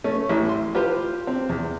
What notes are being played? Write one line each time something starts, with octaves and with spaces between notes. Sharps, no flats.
A3 C#4
A1 E4
C6
F4 G4 B4 C5
C4
E2